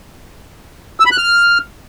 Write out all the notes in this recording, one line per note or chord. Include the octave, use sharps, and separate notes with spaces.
E6
B5
F#6
F6